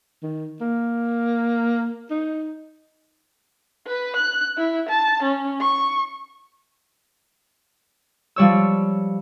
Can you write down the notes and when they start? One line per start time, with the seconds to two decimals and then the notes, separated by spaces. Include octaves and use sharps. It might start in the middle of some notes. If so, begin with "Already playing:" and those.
0.23 D#3
0.61 A#3
2.11 D#4
3.87 B4
4.16 F#6
4.58 E4
4.89 A5
5.23 C#4
5.61 C#6
8.36 F3 G3 C#5 E6